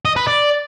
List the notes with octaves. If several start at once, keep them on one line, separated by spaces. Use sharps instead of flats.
D#5
B4
D5